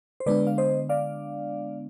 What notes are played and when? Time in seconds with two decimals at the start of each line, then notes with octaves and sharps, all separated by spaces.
0.20 C5
0.26 D3 G#3 B3 D4 B4 D5
0.47 F5
0.58 C5 D#5
0.89 D5 F5